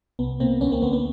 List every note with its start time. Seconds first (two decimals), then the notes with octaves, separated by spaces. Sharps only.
0.19 C2 B3
0.40 B2 A#3 C4
0.61 D2 B3 C#4
0.72 A#3 C4
0.82 D2 B3
0.93 B3